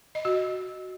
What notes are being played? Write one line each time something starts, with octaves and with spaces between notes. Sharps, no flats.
D#5
F#4